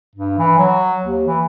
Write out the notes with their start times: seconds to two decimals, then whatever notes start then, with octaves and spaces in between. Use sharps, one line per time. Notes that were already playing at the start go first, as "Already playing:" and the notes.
0.16 G2
0.38 E3
0.58 F#3
1.05 D#2
1.27 E3